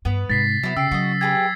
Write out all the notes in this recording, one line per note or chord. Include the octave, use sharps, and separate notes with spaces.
G2 B3 B4
G#2 C3 A6 B6 C7
F#3 B3 E4
C#3 G4 E6 C7
F#3 F#4 D#5
G4 G#4 B4 G#6